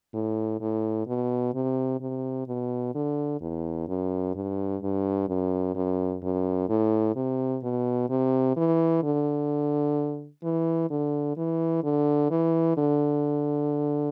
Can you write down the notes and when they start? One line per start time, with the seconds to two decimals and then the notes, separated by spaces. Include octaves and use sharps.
0.14 A2
0.60 A2
1.07 B2
1.54 C3
2.01 C3
2.48 B2
2.94 D3
3.41 E2
3.88 F#2
4.34 G2
4.82 G2
5.28 F#2
5.75 F#2
6.22 F#2
6.69 A2
7.16 C3
7.63 B2
8.09 C3
8.56 E3
9.03 D3
10.43 E3
10.90 D3
11.37 E3
11.84 D3
12.30 E3
12.77 D3